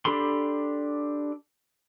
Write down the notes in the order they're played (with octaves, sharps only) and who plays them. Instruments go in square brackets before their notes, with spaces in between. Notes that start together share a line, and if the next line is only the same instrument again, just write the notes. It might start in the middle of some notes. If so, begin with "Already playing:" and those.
[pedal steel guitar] D4 G4 A4 B5 C6